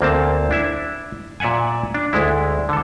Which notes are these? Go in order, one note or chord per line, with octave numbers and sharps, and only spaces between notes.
D2 A#3 C4 A5
D4 E4 E5
A#2 D5 E5 F#5 G#5
D4
D2 G#3 E4
D3 A4